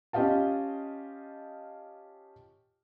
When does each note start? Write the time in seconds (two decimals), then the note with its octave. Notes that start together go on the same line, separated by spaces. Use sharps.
0.13 C#4 F4 G4 D#5 F5 A5